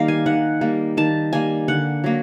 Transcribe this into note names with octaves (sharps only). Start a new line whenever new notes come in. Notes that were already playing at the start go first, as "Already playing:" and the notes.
Already playing: D#3 G3 A#3 F5
G#5
D#3 F#5
G3 A#3
D#3 A5
G3 A#3 G#5
D3 F#5
F#3 A#3